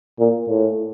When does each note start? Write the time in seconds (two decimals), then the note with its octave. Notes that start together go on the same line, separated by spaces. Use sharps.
0.19 A#2
0.49 A2